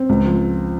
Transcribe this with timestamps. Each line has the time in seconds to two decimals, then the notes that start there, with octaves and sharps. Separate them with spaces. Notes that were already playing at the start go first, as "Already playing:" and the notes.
Already playing: C4
0.09 C#2
0.25 F3